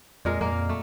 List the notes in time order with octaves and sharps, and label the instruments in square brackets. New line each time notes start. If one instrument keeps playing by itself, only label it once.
[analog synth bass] F2 [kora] A#2 G#3 A#4
[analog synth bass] F2 [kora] A#3 A#4 F5
[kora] A3